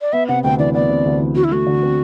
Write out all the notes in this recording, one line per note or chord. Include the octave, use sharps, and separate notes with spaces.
D5
B3 E5
C3 F#5
D2 G5
E3 D5
B3 D5
C3
D2
E3
D3 F#4
E4
A3 F#4
D3
C4